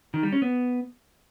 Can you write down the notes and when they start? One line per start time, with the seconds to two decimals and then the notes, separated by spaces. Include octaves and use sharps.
0.14 D#3
0.23 G3
0.32 C#4
0.42 B3